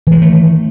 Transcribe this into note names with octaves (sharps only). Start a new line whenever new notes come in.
D#3 E3 G#3 A3